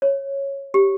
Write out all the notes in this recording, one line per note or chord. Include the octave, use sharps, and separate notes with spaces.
C#5
G4